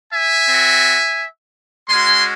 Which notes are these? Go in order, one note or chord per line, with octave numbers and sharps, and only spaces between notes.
E5 G#5
C4 F#4
G#3 C#4 F#4 G#5 C6